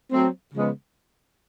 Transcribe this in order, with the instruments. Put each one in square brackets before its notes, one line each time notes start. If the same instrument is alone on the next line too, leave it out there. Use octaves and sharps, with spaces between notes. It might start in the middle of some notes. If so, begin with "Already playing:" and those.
[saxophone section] F#3 A3 C4
C#3 F3 G#3 B3